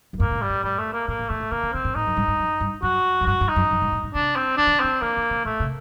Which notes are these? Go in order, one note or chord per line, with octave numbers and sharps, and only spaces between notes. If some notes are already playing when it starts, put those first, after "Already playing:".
F#2
G2 A#3
A#2
A2
G3
G2
A2 G3
A3
A#3
A#2 A#3
A#2
A#2 A3
A#2
C3 A#3
D3
C3 C4
A#2
A2 D#4
F#2
G2
G2
F#2
G2
F#2 F#4
F#2
G2 F#4
G2
D#4
F#2
F#2
G2
A2
A#2
C3 D4
C4
D#3 D4
D3
C3
D3 C4
D#3 A#3
D3
C3
A#2 A3
C3